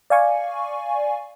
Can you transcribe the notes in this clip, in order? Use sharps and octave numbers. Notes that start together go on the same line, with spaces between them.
D5 F5 G#5 C#6